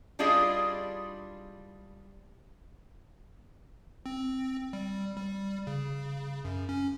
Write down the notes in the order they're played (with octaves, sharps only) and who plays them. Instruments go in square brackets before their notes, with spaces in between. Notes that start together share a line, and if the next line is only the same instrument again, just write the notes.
[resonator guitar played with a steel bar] G3 D4 E4 F4 G#4 D#5
[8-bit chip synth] C4
G3
G3
C#3
F#2
C#4